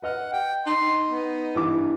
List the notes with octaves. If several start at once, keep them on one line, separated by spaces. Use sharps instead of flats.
B4 D#5 F#5 F6
G5
D#4 C6
B3
G2 E3 D6